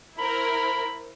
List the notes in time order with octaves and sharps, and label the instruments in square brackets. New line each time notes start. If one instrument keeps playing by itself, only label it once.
[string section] E4 A#4 C5 [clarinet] B5